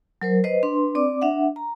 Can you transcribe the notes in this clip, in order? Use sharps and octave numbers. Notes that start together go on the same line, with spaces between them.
F#3 A#4 C5
B4 C5 D#5
D4 B4 C6
C4 D5 D6
D4 E5 F#5
A#5